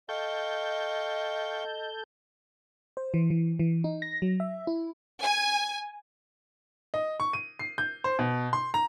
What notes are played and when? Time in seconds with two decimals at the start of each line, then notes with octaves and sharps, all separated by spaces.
0.09 A4 D#5 F5 G5 C#6 G6
2.97 C5
3.14 E3
3.30 E3
3.59 E3
3.84 D#4
4.02 A#6
4.22 F#3
4.40 E5
4.67 E4
5.21 G#5
6.94 D#5
7.20 C#6
7.33 D#7
7.59 C7
7.78 G6
8.04 C5
8.19 B2
8.53 C6
8.74 A#5